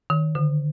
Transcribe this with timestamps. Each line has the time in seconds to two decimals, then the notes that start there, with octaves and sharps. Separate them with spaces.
0.10 D#3
0.35 D3